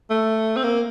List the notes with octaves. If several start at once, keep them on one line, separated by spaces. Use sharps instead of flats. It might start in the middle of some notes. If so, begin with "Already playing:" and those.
A3
C4
A#3